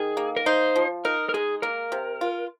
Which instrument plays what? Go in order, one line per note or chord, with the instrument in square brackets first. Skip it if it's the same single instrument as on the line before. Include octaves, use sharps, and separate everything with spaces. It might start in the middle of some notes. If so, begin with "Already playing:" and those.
Already playing: [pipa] D#3 [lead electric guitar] G#4
[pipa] A#3
[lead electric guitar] A#4
[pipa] D#4 [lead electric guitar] C5
[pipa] F3
[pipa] D#4 [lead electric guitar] A#4
[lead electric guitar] A#4
[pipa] G#3 [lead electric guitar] G#4
[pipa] A#3 [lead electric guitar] A#4
[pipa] C3
F4